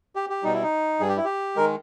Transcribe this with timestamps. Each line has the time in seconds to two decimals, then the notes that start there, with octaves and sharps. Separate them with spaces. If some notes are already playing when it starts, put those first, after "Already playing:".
0.16 G4
0.30 G4
0.43 B2 G3 D#4
0.54 E4
0.63 D#4
1.00 G2 G3 G#4
1.09 G4
1.17 E4
1.24 G4
1.56 D#3 G#3 A#4